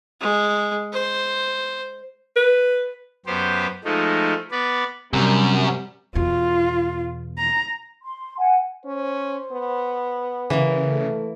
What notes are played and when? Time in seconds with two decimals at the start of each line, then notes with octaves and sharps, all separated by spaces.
0.21 G#3
0.93 C5
2.36 B4
3.26 F#2 B3 G4 C5
3.85 F3 G#3 A3 D#4
4.51 B3 B4 D5
5.13 F#2 C3 G3
6.15 E2 B2 F4
7.38 A#5
8.03 C6
8.39 F#5 G#5
8.85 C#4 C5
9.52 B3
10.50 C#3 E3 A#3
10.87 A3